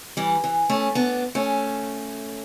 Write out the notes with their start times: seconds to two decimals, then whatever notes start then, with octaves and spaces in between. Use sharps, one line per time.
0.17 E3 G3
0.44 E3
0.70 A3 C#4
0.95 B3 D4
1.35 A3 C#4